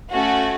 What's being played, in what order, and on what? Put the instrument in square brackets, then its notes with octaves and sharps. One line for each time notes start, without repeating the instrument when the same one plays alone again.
[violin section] A3 C#4 F#4